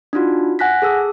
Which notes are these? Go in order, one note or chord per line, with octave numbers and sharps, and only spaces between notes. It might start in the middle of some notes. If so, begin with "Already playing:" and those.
D4 D#4 F4 F#4
F#5 G#5 F#6 A#6 B6
G#4 A4 E6